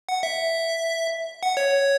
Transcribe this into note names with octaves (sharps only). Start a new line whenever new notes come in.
F#5
E5
F#5
C#5